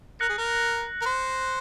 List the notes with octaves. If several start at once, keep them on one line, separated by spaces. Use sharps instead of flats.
A#4 F#6 A#6 C#7 F#7
G#4
A#4
A#4
C5